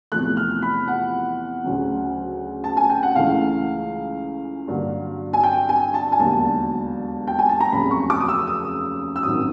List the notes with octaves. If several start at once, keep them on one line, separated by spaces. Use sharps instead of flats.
E2 C3 F3 A3 F#6
F6
B5
F#5
D2 C#3 F#3
A5
G#5
G5
F#5
C#2 C#3 E3 A3 F5
G2 D3 F#3 A#3
G#5
G5
G#5
A5
G#5
E1 D#2 D3 F#3 A#3 A5
G5
G#5
A5
A#5
F1 D#2 C#3 F#3 B5
C#6
D6
D#6
E6
D#6
E6
G#1 F#2 D#3 F#3 D#6